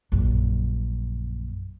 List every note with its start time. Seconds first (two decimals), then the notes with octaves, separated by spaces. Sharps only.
0.12 A#1 F#2